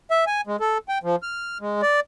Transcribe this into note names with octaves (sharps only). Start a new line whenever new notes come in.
E5
G#5
G#3
A4
G5
F3
F6
G#3
D5